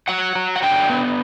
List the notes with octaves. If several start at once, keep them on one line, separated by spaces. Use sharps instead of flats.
F#3 F#5
F#3
F#5
D3 G5
B3